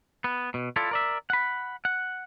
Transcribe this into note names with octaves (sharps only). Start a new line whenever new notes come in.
B3
B2
E4 F4 A4 D5
A#4 D5 E5
F#5 B5
F#5